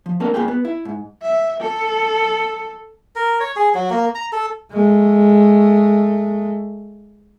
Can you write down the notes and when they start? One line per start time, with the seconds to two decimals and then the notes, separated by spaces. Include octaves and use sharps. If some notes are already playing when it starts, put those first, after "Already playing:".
0.06 F3
0.20 A3 A#3 C4 D4 A4 A#4
0.34 G2 A#3 F4 G#4 G5
0.48 B3
0.65 E4
0.85 G#2
1.22 E5
1.60 A4
3.16 A#4
3.40 C#5
3.56 G#4
3.75 F#3
3.90 A#3
4.15 A#5
4.32 A4
4.71 G#3 A3